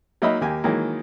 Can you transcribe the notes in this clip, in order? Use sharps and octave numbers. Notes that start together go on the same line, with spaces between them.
F#3 A#3 D#4 D#5 E5 B5
D#2 A#3 G4 G#5
D#3 E3 F#3 G#3 A#3